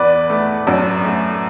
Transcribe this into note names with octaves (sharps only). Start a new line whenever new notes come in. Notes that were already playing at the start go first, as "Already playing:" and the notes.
Already playing: E2 B4 D5
A3
F#2
A3